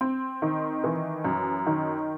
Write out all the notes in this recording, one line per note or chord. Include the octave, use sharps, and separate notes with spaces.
C4
D#3
E3
F#2
D#3